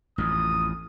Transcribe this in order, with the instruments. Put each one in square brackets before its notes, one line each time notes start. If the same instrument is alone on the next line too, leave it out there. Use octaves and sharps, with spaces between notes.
[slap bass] A1 F2 [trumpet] D#6